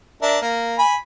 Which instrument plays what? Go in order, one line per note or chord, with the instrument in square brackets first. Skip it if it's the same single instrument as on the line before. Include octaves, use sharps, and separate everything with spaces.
[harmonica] D4 A#4 E5
A#3
G#5 B5